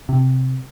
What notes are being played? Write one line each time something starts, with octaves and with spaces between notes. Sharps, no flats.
C3